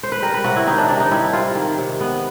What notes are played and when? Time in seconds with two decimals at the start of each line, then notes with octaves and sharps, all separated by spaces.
0.03 C5
0.12 B4
0.22 G3 A#4
0.34 B4
0.44 C3 F#4
0.56 E4
0.67 D#3 D#4
0.78 D4
0.89 C3 D4
1.00 D#4
1.11 G3 E4
1.33 C3 F4
1.55 D#3
1.78 C3
2.00 B3